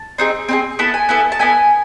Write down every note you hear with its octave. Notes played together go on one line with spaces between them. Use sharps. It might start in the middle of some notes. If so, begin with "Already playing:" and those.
Already playing: A5
C4 D#4 G#4
C4 D#4 G#4
B3 E4 A4 A5
G#5
B3 E4 A4
A5
B3 E4 A4 G#5